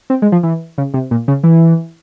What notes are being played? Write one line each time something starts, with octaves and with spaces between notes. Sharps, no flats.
C4
G#3
F3
E3
C#3
C3
A#2
C#3
E3